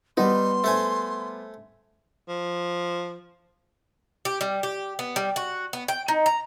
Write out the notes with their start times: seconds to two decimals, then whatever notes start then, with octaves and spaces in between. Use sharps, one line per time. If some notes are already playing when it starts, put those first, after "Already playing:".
0.17 G3 B3 D#4 C6
0.64 A3 C5 G#5
2.28 F3
4.25 G4
4.41 G3
4.63 G4
4.99 B3
5.16 G3
5.36 F#4
5.73 B3
5.88 G5
6.08 D#4
6.26 A#5